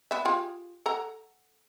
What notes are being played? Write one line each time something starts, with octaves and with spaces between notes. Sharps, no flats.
B3 E5
F4 G4 G#4
A4 F#5 A#5